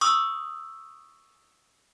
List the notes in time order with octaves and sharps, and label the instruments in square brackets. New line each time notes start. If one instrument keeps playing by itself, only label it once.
[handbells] C#6 D#6 E6